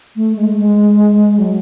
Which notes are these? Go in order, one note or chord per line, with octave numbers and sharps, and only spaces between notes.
A3
G#3
G#3
F#3